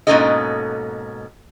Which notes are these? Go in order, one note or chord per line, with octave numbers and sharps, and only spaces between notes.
G#2 B2 A#3 C#4 A4 D#5